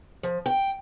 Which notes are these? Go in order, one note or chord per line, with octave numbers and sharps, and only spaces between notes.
F3
G5